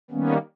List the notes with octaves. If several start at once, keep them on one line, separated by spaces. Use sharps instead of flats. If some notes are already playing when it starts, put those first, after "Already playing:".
D#3 G3 A#3 B3 C#4